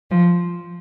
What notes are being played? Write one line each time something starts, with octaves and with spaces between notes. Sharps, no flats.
F3